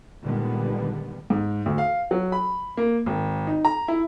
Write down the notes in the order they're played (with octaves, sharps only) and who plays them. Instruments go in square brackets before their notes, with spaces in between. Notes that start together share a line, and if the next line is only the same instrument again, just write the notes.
[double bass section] A#2 D3 D#3 G3 G#3 B3
[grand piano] G#2
D2
F5
F#3
B5
A#3
G#1
D#4
A#5
E4